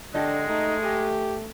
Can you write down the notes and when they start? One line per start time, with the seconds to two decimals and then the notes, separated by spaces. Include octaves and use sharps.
0.14 D3 G#3 D4 G4 A4 D#5
0.49 A3 D#4
0.83 G4 G#5